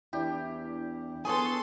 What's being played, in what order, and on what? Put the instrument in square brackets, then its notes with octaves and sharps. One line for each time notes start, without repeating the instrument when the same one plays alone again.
[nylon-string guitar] E2 [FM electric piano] D4 E4 [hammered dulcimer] G4
[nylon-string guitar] B3 G#5 [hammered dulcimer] G#4 C#5 [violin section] A4 C6